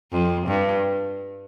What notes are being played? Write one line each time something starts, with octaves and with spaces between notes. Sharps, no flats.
F2
G2